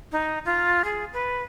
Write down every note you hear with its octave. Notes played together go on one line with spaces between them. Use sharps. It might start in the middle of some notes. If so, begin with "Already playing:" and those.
D#4
F4
G#4
B4